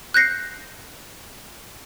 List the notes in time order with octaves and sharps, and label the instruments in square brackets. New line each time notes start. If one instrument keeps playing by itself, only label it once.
[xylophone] F#6 G6 A#6 C7 C#7